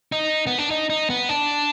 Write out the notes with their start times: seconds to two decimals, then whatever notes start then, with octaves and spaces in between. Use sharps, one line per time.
0.12 D#4
0.47 B3
0.58 D4
0.71 D#4
0.90 D#4
1.10 B3
1.29 D4